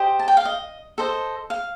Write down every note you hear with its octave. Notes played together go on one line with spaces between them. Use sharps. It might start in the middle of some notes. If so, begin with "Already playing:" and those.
Already playing: G4 C5 D#5
A5
G5
F5
D#5
A4 C5 D#5
F5